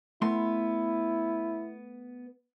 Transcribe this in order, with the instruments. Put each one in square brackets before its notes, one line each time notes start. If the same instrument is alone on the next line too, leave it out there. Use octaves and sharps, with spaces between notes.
[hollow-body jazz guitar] A3 B3 C6 [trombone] E4